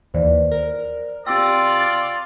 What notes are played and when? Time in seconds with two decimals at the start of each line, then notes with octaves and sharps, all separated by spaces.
0.14 D#2 E3 C5 D5
0.51 A#4
1.26 C3 F4 D5 G5 E6 A#6